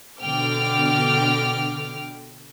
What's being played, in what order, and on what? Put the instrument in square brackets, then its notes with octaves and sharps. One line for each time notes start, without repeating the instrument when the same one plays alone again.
[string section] B2 D3 G5 D6 F6